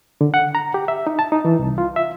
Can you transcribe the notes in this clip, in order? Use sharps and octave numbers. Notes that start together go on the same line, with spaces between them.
D3
F#5
A#5
G4
E5
D#4
A5
D#4
E3
C2
F4
E5